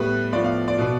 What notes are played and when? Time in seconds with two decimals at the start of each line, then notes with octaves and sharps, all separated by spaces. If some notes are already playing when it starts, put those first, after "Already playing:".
Already playing: A2 G3 B3 B4
0.33 A2 F3 B3 D5
0.44 F5
0.68 D5
0.78 B2 B3